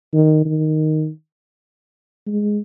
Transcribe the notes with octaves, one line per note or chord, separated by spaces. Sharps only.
D#3
D#3
G#3